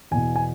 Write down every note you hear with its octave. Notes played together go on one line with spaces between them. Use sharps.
E2 B2 G#5
G#5